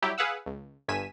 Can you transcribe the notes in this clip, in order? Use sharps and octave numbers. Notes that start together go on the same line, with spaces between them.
F#3 G3 E4 G4
G#4 B4 F5 F#5 E6
C#2
G1 G2 G#5 B6 D#7 E7